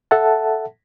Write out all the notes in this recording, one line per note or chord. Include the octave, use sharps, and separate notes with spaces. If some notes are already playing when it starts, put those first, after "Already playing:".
A4 E5 F#5 A5